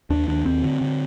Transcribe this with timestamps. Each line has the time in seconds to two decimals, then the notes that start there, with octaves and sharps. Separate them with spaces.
0.10 D#2 D4
0.28 D#2 D4
0.45 D#2 C4
0.63 D3
0.81 D3